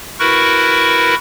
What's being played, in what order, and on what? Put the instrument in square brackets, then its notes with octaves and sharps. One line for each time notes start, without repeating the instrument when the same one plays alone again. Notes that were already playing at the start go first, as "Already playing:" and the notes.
[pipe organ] E4 F#4 A#4 B4 C#6